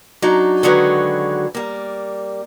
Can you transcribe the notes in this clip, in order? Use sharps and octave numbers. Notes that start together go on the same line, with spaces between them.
F#3 D4 D#4
D3 D#3 F#3 G#3 F#4 B4
G3 A#3